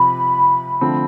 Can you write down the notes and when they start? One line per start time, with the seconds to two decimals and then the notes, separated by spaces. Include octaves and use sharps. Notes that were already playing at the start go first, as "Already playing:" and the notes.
Already playing: C3 F3 C4 B5
0.81 D3 F3 A3 C4